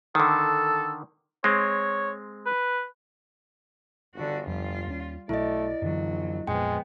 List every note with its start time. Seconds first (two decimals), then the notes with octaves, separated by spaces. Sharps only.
0.15 D3 D#3 A4
1.44 G#3 C4 C#5
2.46 B4
4.15 G1 D3 F#4
4.47 F1 F2 G3 F4
4.87 D#2 C#4
5.29 B1 B2 A3 E4 D5 D#5
5.82 A#1 F#2 D3 E3 F#3
6.47 F2 A#2 F3 G#3 B3 G5